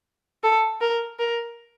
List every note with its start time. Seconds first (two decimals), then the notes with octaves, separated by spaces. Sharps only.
0.43 A4
0.81 A#4
1.19 A#4